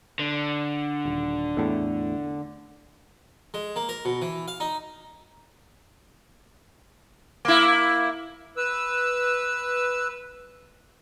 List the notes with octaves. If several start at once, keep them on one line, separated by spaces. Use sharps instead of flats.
D3
D#1
E2 A2
G#3
A#3
A#4
B2
E3
F5
D#4
A#3 E4
B4 E6